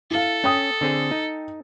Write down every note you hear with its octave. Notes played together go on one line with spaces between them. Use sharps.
E4 A4 F5
C#4 G5 D#6
D3 C4 G#4
D#4